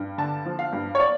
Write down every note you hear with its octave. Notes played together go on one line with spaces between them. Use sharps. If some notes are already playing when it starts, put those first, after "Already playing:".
Already playing: G2
D3 A5
F3
F5
G2
C#5
D5